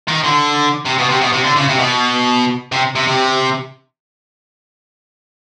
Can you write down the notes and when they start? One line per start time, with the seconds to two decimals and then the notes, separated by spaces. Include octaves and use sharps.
0.08 D#3
0.24 D3
0.85 C3
0.98 B2
1.09 C3
1.21 B2
1.33 C3
1.44 D3
1.56 C#3
1.68 C3
1.79 B2
2.72 C3
2.96 C3
3.07 C3